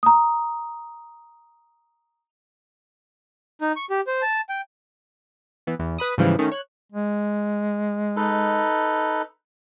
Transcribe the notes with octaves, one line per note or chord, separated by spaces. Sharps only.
A#5 D#6
D#4
C#6
G4
C5
A5
G5
E3 B3
E2
B4 B5 D#6
G#2 C#3 E3 F3 G3
D#3 A3 C#4
C#5 F#6
G#3
D#4 A4 B4